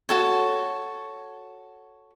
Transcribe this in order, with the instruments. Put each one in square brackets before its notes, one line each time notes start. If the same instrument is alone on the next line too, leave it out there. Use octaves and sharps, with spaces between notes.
[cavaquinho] F#4 A4 C#5